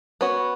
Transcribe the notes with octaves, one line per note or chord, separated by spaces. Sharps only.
B3 F#4 C#5